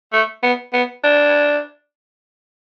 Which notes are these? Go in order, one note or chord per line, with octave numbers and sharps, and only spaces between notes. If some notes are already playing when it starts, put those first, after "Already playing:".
A3
B3
B3
D4